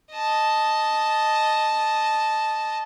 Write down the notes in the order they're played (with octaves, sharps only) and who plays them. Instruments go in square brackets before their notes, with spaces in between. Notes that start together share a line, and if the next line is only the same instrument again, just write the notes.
[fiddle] D#5 A5